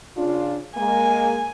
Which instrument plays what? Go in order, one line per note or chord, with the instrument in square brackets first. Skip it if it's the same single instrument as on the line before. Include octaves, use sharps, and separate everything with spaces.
[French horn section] C#3 D4 F4
[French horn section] G#3 A#3 [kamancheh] G#5